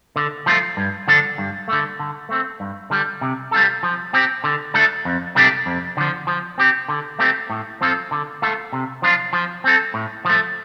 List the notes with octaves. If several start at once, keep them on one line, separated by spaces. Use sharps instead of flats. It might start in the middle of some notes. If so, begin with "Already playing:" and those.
D3
F3 A3 F4
G2
D3 F3 D4 A4
G2
D3 A3
D3
A3 C4
G2
D3 G3
C3
G3 F4 A4
F3
C4 G4
D3
A3 D4 A4
F2
C3 A3 D4 G4
F2
D3 F3
F3
C4 G4
D3
A3 C4 G4
A2
F3 C4 F4 A4
D3
A3 F4 A4
C3
F3 D4 F4
F3
C4 A4
A2
F3 A3